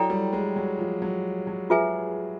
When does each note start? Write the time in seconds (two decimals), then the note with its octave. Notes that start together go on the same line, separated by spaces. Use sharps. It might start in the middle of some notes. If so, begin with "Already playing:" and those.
Already playing: F#3 E4 A4 D5 G5 A#5
0.10 G3
0.33 G#3
0.56 F#3
0.79 F3
1.02 F#3
1.47 F#3
1.70 F4 G#4 B4 E5 G#5